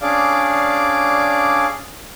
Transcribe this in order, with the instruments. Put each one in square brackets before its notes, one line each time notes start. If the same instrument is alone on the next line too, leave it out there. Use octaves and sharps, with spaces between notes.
[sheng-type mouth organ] C#4 D4 G#4 D5 F5 D6